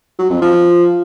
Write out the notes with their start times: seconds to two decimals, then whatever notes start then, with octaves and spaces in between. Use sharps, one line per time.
0.19 F#3
0.30 F2
0.42 F3